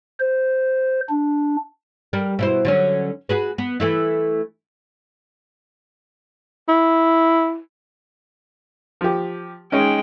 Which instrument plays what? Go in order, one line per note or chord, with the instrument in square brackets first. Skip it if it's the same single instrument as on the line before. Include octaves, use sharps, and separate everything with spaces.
[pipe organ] C5
D4
[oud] G3 A#4
B2 E4 C5
D3 F#3 C#4
F#4 G#4 B4
B3
E3 A3 E4
[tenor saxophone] E4
[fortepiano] F3 G4
[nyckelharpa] G#3 G5 [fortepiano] C#4 D#4